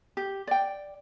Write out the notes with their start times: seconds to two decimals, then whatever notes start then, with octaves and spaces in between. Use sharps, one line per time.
0.17 G4
0.47 D5 G5